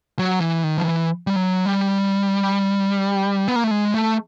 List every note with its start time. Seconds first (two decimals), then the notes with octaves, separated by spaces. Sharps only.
0.19 F#3
0.41 E3
0.64 D#3
0.77 F3
0.85 E3
1.27 G3
1.37 F#3
1.66 G3
3.48 B3
3.56 A#3
3.64 A3
3.71 G#3
3.94 A3